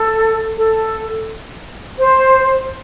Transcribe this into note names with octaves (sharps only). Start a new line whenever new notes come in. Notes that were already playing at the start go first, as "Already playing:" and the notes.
Already playing: A4
A4
C5